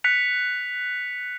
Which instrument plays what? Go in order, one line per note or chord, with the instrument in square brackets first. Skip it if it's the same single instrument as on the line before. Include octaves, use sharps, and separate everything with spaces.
[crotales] F#6 B6 C#7 F7